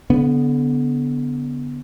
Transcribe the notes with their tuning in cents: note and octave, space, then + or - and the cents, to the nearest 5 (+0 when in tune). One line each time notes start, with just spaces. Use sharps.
D3 -30 B3 +0